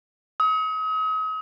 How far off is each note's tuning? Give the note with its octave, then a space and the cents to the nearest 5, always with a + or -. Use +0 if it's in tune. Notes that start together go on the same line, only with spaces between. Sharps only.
D#6 +40